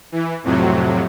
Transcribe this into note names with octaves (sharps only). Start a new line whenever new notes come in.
E3
F2 A2 C3 F#3